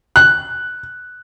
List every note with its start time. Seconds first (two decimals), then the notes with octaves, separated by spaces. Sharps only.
0.16 F#6